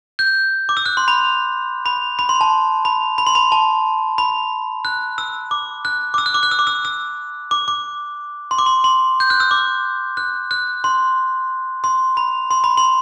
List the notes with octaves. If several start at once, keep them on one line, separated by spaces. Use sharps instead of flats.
G6
D6
E6
F#6
C6
B5
B5
B5
C6
A5
B5
B5
C6
B5
A5
B5
F#6
E6
D6
F#6
D6
E6
F#6
D6
F#6
E6
D6
E6
E6
D6
D6
C6
D6
C6
C6
G6
F#6
E6
D6
F#6
F#6
C6
C6
B5
C6
B5
C6